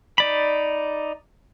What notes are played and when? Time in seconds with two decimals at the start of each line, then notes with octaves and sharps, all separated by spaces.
0.18 D#4 D5 B5